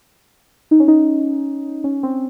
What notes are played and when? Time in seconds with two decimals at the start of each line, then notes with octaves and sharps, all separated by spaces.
0.71 D#4
0.80 C#4
0.88 D#4
1.84 C#4
2.03 C4